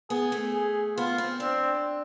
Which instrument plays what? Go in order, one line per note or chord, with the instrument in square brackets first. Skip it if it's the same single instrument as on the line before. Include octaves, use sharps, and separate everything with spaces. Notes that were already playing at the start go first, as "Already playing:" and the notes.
[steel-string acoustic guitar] B3 [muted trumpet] G#4
[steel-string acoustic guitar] A3
[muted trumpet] G#4
[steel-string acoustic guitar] B3 [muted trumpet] F4
[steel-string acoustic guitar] C4
[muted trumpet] C4 [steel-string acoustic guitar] D4